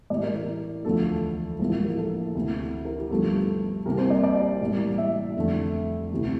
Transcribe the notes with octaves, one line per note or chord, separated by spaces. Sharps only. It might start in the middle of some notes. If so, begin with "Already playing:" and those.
A1 A2 E3 D5
A#4
A#4
E1 D2 D3 F3 A3 A4
A#1 A2 F3 A#3
A#4
A4
D2 C3 E3
A#4
G4
G1 G2 F3 A3 A4
C2 C3 G3 A#3 A#4
C5
D5
D5
A1 A2 G3 A#3
E5
F2 D3 A3
D2 C3 E3 A3